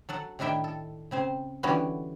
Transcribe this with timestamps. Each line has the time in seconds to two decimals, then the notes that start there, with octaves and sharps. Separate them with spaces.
0.09 F#3 A4 F#5
0.39 A2 D#3 D4 E4 E5 G5
0.64 A4
1.11 C#3 C4 C5
1.63 D3 E3 G3 B3 C#4 F#4